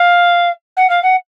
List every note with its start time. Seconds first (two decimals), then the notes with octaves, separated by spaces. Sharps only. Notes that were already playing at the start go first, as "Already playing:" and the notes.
Already playing: F5
0.77 F#5
0.89 F5
1.02 F#5